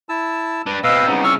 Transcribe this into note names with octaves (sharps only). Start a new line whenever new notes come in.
E4 A5 E6
D4 B4
B2 C4 B4 D#5 F5 E6
C2 C#3 B3 D#4
C#6 E6 F6